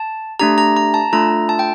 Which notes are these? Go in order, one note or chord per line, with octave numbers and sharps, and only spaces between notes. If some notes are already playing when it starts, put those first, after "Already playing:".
Already playing: A5
A3 D4 G4 A#5
A#5
A#5
A5
A3 D4 F4 A4 A#5
A5
G5